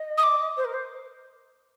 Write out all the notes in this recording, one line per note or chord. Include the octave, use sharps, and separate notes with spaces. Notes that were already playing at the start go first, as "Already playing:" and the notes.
Already playing: D#5
D#6
D6
C5
A#4
C5